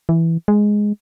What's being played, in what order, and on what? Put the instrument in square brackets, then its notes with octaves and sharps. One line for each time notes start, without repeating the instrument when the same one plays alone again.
[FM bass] E3
G#3